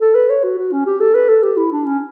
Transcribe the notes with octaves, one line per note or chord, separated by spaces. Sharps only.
A4
B4
C#5
F#4
F#4
C#4
G4
A4
B4
A4
G4
E4
D4
C#4